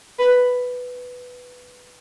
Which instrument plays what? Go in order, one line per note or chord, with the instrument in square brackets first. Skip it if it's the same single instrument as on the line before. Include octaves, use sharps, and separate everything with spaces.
[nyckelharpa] B4